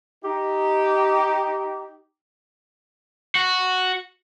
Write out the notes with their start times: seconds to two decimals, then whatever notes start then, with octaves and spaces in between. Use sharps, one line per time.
0.24 D#4 G4
3.35 F#4